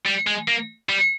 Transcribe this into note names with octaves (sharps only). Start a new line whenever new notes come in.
G3
G#3
A#3
G3